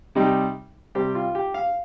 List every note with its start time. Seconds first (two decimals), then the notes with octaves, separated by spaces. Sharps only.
0.15 C3 G3 D#4
0.95 C3 G3 C4 G4
1.15 F4
1.35 G4
1.54 F5